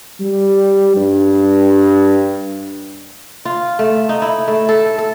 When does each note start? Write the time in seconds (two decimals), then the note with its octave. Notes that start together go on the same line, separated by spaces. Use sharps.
0.20 G3
0.96 G2
3.45 F4
3.79 A3
4.09 D#4
4.22 E4
4.48 A3
4.69 A4
4.98 A4